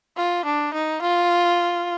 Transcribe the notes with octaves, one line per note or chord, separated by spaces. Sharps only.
F4
D4
D#4
F4